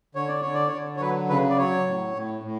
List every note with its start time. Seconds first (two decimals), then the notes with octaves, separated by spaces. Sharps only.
0.15 D3 C#5
0.28 D5
0.41 D3 C#5
0.54 D5
0.68 D3 C#5
0.96 C#5
1.01 F#3 B4
1.29 C#3 B4
1.50 D5
1.58 F#3 C#5
1.87 A2
2.15 A2
2.44 A2